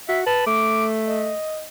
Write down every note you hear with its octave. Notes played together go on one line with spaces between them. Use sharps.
F#4 E5
B4 A5
A3 D6
D#5